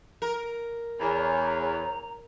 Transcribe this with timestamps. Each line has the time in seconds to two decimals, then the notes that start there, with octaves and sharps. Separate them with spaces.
0.22 A#4
1.00 E2 C#5 A#5